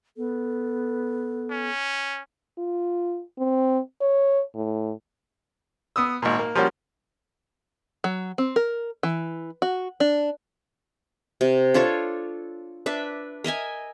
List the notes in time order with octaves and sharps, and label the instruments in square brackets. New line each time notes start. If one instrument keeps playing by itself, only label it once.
[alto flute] B3 [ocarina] A4
[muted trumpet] C#4
[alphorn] F4
C4
C#5
A2
[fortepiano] B3 D#6 E6
G#1 A#2
A#3
F3 G3 A#3 C#4 F#4
[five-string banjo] F#3
C4
A#4
E3
F#4
D4
[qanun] C3
D4 F4 A4 C#5
D4 B4 E5
A#4 D#5 E5 G#5